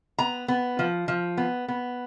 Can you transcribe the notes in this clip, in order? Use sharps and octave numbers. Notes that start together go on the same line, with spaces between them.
B3 A#5
B3
F3
F3
B3
B3